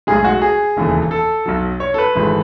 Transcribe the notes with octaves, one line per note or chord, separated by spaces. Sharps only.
B1 A2 G#3 G#4
F#4
G#4
E1 D#2 C#3 E3 A3
A4
B1 B2 F#3
C#5
A4
B4
G#1 G#2 E3 A3